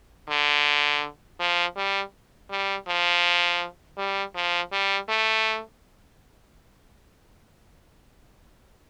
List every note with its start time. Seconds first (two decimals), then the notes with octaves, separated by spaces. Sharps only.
0.29 D3
1.40 F3
1.76 G3
2.50 G3
2.88 F3
3.97 G3
4.35 F3
4.72 G3
5.09 A3